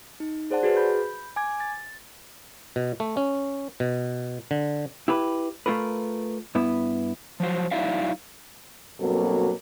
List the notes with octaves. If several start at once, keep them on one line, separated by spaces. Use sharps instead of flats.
D#4
G#4 C5 D5 F#5 A5
F#4 G#4 B4
B5 G6
G#5 D6 G#6
A6
B2
A3
C#4
B2
D3
E4 G4 B4
A3 F4 A#4 B4
G2 B3 E4
F3 F#3 C5
F#3 D#4 E4 D5 E5 F5
G2 B2 F#3 A#3 C4 A4